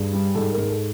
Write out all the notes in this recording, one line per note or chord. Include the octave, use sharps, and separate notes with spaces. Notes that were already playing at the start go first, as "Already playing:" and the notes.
Already playing: G2 G#4
G3
G#2 A4
A#4
G#2
A4